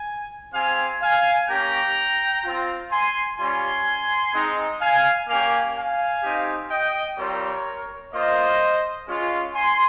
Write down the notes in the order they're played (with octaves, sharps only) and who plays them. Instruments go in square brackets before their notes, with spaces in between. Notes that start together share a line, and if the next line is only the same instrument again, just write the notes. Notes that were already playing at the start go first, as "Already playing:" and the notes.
Already playing: [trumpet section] G#5
C4 G4 F5 G#5
F5 G#5
A#3 C#4 G4 G5 A#5
C4 F4
G#5 C6
G3 C#4 F4 G#5 C6
G#3 C4 D#4
F5 G#5
A#3 C#4 G4 F5 G#5
F5 G#5
C4 D#4 G4
D#5 G5
G3 C4 F4 A#4 C#5
A#3 F4 C5 D#5
G#3 C#4 F4
G#5 C6